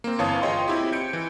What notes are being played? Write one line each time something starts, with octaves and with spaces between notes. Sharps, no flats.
A#3 C4
G1 E3 C#5 F5 A5 D#6
F4 G#4 C#5 D#5 G5 C6
C4 E4 G4
G6 C#7 D7
E3